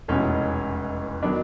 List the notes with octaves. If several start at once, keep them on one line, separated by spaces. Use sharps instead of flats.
F1 E2 B2 G#3 C#4
D#3 F#3 B3 D4